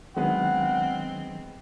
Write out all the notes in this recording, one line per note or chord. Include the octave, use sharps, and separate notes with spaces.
D#3 F#3 G#3 B3 C4 D4 F#5